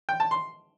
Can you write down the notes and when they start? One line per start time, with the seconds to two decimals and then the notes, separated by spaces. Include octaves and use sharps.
0.09 G5
0.20 A5
0.31 C6